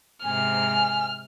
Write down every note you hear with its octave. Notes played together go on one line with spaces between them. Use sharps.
G#2 C3 G#5 F6